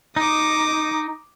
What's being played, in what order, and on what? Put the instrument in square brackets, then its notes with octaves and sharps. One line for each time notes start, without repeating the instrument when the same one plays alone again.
[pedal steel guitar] D#4 [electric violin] D6 D#6